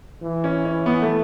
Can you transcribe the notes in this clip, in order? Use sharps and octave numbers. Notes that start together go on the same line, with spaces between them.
E3
C#4
C#4
B3
A3